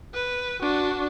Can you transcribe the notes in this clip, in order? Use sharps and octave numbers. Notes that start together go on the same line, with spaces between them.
B4
D4 F#4